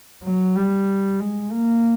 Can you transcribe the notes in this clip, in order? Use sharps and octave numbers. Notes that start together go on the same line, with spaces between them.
F#3
G3
G#3
A#3